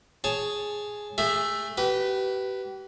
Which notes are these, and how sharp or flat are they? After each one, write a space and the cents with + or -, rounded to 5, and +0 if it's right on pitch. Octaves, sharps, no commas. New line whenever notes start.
G#4 +0 C#5 +0 A5 -10
A3 +0 G#4 -30 E5 +5
G4 -35 B4 +0